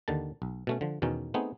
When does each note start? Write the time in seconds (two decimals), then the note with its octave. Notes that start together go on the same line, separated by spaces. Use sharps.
0.08 D#2 D3 D#3 A5
0.42 B1
0.67 B2 A3 C#4
0.81 D3 F3
1.02 E2 B2 D#3 C#4 D#4
1.34 A3 B3 C4 D#4 G#4